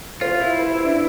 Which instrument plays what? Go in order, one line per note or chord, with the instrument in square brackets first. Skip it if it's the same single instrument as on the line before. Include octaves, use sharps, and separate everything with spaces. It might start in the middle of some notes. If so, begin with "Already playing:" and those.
[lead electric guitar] F4 [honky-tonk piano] C5
[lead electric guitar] E4
[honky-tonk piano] B4
B4
D4